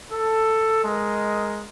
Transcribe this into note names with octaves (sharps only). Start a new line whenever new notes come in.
A4
G#3 A#4 D#5